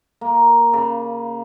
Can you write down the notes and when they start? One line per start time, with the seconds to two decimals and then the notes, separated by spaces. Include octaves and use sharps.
0.21 A#3
0.73 C#3